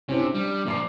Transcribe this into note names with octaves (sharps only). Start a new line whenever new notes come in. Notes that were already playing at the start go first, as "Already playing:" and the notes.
C3 C#4 E4 C5
D4
G3
A#2 F3 D5 D6 C7